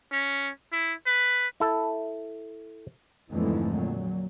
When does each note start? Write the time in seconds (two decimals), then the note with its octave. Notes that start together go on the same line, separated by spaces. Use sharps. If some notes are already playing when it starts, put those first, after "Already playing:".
0.12 C#4
0.72 E4
1.06 B4
1.60 E4 A4
3.30 F2 G#2 D3 E3 G#3 A3
3.72 A#2 F#3